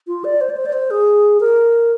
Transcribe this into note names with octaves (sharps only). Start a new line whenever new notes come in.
F4
D5
C5
D5
C5
D5
C5
G#4
A#4